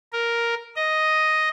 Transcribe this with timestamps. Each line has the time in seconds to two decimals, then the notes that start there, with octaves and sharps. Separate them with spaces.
0.13 A#4
0.76 D#5